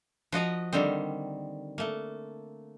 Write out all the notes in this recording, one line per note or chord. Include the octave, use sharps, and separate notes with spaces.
F3 F#4 D#5 A#5
D3 D#3 G3 A#3 C4
A3 A#3